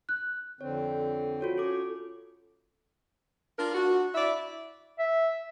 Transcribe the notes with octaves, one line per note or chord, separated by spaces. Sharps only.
F#6
F2 D3 C4 C#5
F4 F#4 C#5
C#4 A4 C#5 D6
D4 F4 A#4
D4 F#4
E4 D5 E5
E5